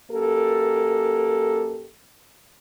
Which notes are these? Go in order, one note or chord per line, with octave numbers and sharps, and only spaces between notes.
F#2 A#3 G4 A4